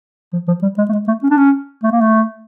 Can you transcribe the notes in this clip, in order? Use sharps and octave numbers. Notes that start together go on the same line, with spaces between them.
F3
F3
G3
G#3
A3
G#3
A3
C#4
D4
C#4
A3
A#3
A3